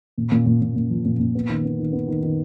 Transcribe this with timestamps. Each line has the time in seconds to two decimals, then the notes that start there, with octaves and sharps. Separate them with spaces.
0.18 A#2
0.32 A#2
0.46 A#2
0.62 A#2
0.76 A#2
0.90 F3
1.05 A#2
1.20 A#2
1.35 B3
1.49 D#3
1.65 B3
1.79 D#3
1.93 B3
2.08 D#3
2.23 D#3